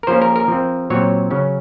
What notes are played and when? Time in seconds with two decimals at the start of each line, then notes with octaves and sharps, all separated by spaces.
0.03 A#4
0.07 F3 A#3 C#4 C5
0.22 A#4
0.36 A#4
0.48 F3 C4
0.90 A#2 F#3 C4 C#5
1.31 C#3 F#3 C#4